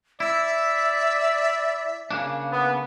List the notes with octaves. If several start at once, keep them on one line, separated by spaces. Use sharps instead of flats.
E4 D5 E5
C#3 A#3 D4
B3